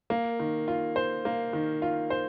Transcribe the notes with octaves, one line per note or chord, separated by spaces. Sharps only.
A#3
D#3
F4
C5
A#3
D#3
F4
C5